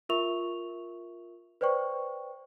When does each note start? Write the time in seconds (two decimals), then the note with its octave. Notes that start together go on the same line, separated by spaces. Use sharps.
0.09 F4 A#4 E5 C#6 F7
1.61 B4 C5 D5 G5 C#6